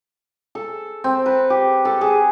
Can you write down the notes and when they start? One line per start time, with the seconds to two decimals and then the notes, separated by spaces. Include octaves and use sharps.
0.55 A4
1.04 C4
1.26 B4
1.50 G4
1.85 A4
2.01 G#4